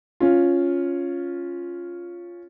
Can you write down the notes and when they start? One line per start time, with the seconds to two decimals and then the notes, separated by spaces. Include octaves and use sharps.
0.20 C#4 F4